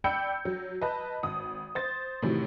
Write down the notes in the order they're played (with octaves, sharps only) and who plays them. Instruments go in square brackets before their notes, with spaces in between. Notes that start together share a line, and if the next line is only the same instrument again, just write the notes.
[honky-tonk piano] D5 G5 B5 E6 G6 C#7
F#3
B4 D#5 A5
G#1 D#6
C5 A6
A2 C3 D#3 E3 F#3